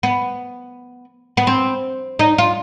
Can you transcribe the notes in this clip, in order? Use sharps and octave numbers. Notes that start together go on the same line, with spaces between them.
B3
B3
C4
D#4
F4